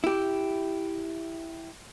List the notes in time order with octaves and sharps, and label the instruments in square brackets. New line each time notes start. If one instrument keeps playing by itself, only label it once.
[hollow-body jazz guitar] E4 G4